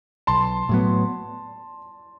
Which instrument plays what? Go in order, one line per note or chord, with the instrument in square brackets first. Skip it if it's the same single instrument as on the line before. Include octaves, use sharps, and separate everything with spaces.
[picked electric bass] B1 [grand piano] A5 C6
[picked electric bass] A2 F#3 B3